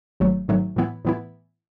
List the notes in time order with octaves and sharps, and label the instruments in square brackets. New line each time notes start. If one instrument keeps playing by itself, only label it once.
[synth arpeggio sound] G#1 G#2 F#3 A3
G#1 G#2 F#3 A3
A2 E3 B3 E4
A2 E3 B3 E4